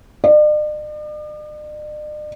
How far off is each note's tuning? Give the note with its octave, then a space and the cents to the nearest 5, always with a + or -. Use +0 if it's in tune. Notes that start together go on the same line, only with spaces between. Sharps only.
D5 +45